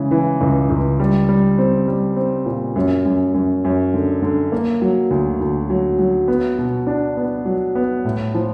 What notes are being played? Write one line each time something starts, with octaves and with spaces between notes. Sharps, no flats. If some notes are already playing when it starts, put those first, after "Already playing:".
Already playing: C#3 E3 G#3
E3
C#2
C#2
G3
G3
C4
G3
C4
A#2
F#2
F#2
F#2
F#2
D3
D3
A#3
F#3
D2
D2
F#3
F#3
B3
B2
D4
B3
F#3
B3
A2
F3